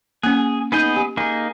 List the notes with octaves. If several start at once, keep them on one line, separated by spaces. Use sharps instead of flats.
A#3 C#4 G#4
B3 D#4 G#4 D#5 G6 D#7
G4 G#5
A#3 D#4 G#4